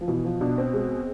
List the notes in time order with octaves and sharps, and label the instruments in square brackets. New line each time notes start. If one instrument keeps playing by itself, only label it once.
[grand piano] F3
[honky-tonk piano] B2 [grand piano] E3
[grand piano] F3
[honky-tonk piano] B2 [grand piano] D4
[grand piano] C4
[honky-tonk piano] G#3